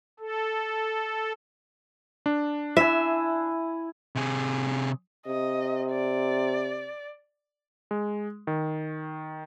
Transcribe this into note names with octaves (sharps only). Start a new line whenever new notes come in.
A4
D4
E4 E5 G#5
C3 G#4
C3 D#5
D5
G#3
D#3